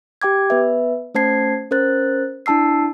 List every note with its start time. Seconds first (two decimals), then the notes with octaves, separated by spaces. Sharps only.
0.22 G4 G5 D6 G#6
0.50 B3 B4 E5
1.15 A3 C#4 C5 A5 G#6 C7
1.71 C#4 A#4 C5 F#6 A6
2.46 D4 E4 A5 E6 C7